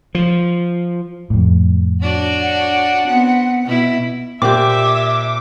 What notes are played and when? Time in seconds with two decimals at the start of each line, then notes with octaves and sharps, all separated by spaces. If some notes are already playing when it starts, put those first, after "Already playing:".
0.15 F3
1.30 F2 A2
2.02 D4 F#4 C#5
2.42 F#5
3.07 B3 C4
3.65 B2 E4
4.42 A#2 C4 G4 E5 D6